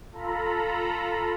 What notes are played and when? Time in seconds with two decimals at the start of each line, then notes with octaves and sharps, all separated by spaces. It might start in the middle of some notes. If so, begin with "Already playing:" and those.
0.12 F4 A4 A#5 B5